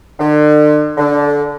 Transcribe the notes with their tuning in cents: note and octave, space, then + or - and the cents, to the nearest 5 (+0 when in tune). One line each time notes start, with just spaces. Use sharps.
D3 +40
D3 -15